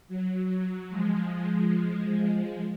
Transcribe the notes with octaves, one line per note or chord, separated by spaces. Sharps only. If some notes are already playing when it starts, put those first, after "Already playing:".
F#3
F3 G#3